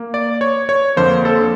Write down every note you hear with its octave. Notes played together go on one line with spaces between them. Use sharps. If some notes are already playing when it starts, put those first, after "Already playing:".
Already playing: A#3
D5
C#5
C#5
F2 D3 F3 A#3 C5
A4